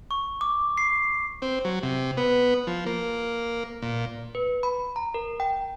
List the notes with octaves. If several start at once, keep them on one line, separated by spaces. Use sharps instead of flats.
C#6
D6
C7
C4
F#3
C3
B3
F3
A#3
A#2
B4
B5
A#5
A#4
G5